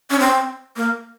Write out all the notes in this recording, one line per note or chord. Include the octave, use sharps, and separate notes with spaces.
C#4
C4
A#3